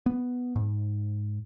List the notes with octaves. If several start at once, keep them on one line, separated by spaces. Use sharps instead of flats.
B3
G#2